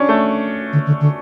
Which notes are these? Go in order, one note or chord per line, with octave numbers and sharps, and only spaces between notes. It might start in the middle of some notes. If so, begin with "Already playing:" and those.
Already playing: C#4 D4
A3
D3
D3
D3